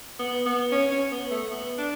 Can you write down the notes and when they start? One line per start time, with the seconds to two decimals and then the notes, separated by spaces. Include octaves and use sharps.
0.19 B3
0.46 B3
0.72 C#4
0.91 C#4
1.11 B3
1.31 A3
1.51 B3
1.78 D4